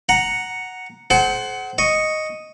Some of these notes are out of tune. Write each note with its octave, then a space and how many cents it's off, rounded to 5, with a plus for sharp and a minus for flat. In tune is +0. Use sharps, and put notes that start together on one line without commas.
F#5 +0 A#5 +0
G#4 +45 C5 -5 F#5 +20
D#5 +0 C#6 +0